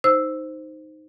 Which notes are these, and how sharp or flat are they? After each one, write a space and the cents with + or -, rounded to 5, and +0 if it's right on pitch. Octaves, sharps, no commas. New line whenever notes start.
D#4 +0 C5 -5 E6 +0